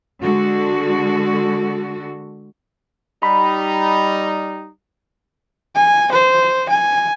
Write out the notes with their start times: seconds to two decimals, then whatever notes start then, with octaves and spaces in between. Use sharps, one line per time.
0.20 D3 G#3 F#4 A4
3.23 G3 D#4 B5
5.75 G#5
6.12 C5
6.69 G#5